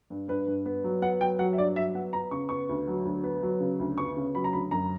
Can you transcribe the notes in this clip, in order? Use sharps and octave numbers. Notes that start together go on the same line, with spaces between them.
G2
G2 B4
G2
B3
F#3
B3 F#5
F#3 G5
F#3 F#5
E5
G2 D5
F#3 E5
B3 F#5
B3 A#5
C#3 C#6
B3 C#6
D2
F#3
D2
B3
F#3
C#3
D2
B3 C#6
C#3
F#3 B5
A#5
D2 B5
F#2 A#5